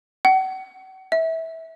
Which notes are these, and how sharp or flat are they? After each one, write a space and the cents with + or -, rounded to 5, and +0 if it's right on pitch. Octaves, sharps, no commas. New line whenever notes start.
F#5 +40
E5 -20